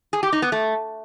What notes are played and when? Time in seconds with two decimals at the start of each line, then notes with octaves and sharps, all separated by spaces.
0.13 G#4
0.23 G4
0.33 D#4
0.42 B3
0.52 A3